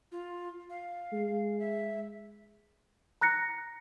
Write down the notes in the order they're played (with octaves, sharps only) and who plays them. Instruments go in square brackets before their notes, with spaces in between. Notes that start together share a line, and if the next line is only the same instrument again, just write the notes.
[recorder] F4
F5
[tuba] G#3
[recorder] E5
[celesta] A#5 F#6 A#6 C#7